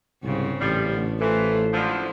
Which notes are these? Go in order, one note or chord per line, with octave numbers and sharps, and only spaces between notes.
C2 G#2 C#3 C4
A1 F3 G3
D3 A3
E3 A3 F4 A4 C5
D3 F3 G#3 E4